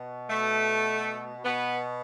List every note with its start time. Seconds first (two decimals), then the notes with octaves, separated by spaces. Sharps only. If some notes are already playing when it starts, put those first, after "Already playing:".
Already playing: B2
0.29 A3
1.45 B2 B3